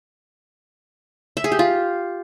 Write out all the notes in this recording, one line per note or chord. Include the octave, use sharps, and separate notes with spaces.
E5
G#4
G4
F4